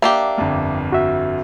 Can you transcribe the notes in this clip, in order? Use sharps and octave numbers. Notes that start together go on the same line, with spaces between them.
A#3 D4 G4 E5
G1 F2
F#4 E5